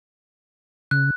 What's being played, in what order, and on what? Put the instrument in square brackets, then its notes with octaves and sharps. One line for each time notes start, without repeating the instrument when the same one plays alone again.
[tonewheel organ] C#3 [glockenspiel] F#6